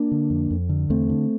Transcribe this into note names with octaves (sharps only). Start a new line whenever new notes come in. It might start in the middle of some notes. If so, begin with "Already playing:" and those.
Already playing: A#3 D4
D3
F2
F2
D3
E2 A3 C4
D3